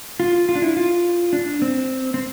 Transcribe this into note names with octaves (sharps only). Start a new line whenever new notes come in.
F4
F4
D4
E4
F4
D4
C4
C4